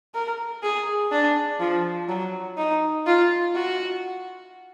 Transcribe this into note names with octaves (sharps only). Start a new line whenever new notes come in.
A#4
G#4
D4
F3
F#3
D#4
F4
F#4